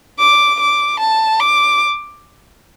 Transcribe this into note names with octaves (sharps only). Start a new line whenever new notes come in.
D6
D6
A5
D6